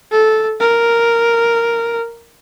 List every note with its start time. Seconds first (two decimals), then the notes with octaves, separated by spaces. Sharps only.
0.12 A4
0.60 A#4